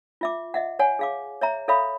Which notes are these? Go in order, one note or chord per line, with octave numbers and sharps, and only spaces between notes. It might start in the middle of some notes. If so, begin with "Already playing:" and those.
F4 E5 D6
D#5 E5 F#5
C#5 F#5 G#5
G#4 F5 D6
C#5 E5 A#5
A4 C#5 E5 F5 B5 D#6